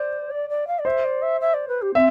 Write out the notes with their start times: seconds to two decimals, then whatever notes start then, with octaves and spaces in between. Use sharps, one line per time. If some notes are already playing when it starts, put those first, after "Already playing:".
Already playing: C5 D5
0.30 D5
0.49 D5
0.67 F5
0.79 D5
0.85 C5 E5
1.04 D5
1.22 E5
1.40 E5
1.53 D5
1.68 B4
1.81 G4
1.95 C4 E5